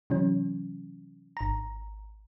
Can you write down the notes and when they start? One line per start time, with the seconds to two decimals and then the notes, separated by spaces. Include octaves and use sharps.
0.10 C3 E3 F#3 C#4
1.37 G#1 A#5